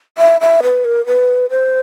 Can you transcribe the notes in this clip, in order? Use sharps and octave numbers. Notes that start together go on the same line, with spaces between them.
E5
E5
B4
A#4
B4
C5